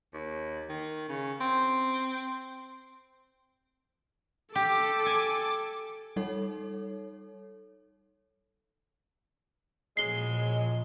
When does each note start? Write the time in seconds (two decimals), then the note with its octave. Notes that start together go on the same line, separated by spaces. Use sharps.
0.14 D#2
0.69 D#3
1.09 C#3
1.41 C4
4.55 G4 A4 D6
5.06 G#5
6.16 G3 D#4 A4 C#5
9.97 A#2 C#3 F3 F#3 G#3 C7 G7